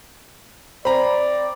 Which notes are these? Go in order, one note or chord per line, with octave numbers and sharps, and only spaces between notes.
C4 D5 A#5 B5